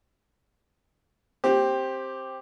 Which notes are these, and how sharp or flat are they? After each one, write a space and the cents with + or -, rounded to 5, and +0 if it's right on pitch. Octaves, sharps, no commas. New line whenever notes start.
C4 +10 G4 +0